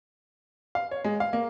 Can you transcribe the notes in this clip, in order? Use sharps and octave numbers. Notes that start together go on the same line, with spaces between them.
F5
C#5
G#3
F5
A#3